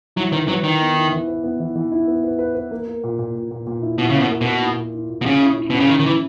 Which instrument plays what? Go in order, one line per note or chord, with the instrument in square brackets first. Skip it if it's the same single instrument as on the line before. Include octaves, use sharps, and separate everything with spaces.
[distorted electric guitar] F#3 [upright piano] E4
[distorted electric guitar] D#3 [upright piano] B4
[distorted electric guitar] F#3 [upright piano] B4
[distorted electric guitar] D#3 [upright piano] E4
[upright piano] B3
E4
E3
B4
B3
E3
E3
E4
B3
B4
B4
B4
A#3
A#4
A#2
A#2
A#2
A#2
A#2
E4
[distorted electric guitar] B2 [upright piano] E4
[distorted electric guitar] C#3
[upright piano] A#3
[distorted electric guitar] B2
[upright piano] A#3
[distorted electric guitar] B2
[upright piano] A#3
E4
A#4
E4
A#2
[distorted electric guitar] B2
[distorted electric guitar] C#3 [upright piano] C#4
[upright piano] E4
E4
[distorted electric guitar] B2 [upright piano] C#4
[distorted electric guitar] C#3
[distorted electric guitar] D#3 [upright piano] E4
[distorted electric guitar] D#3
[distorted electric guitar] E3 [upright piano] E4